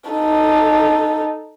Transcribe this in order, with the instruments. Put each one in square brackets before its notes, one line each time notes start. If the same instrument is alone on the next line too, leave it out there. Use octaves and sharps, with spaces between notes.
[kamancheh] D#4 A4